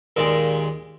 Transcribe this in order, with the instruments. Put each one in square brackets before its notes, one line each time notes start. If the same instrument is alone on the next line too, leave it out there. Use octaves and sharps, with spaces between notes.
[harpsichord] D#2 A#2 G#3 D5